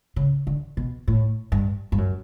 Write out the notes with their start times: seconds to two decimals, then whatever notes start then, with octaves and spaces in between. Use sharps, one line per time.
0.16 C#3
0.47 D3
0.77 B2
1.08 A2
1.52 G2
1.92 G2
1.98 F#2